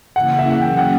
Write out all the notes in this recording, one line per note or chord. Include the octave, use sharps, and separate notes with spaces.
C#3 E3 A#3 E4 F#5
E5
F#5
C#3 F#3 A#3 C#4 G5
F#5